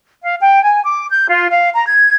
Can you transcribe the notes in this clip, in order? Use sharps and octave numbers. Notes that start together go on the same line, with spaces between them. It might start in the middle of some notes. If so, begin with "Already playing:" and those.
F5
G5
G#5
D6
G6
F4
F5
A#5
G#6